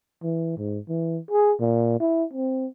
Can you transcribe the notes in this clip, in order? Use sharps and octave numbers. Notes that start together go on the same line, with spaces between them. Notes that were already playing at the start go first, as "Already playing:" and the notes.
E3
G#2
E3
G#4
A#2
E4
C4